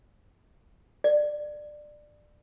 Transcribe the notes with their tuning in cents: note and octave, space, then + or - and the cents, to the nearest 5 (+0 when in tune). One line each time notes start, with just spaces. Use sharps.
D5 +20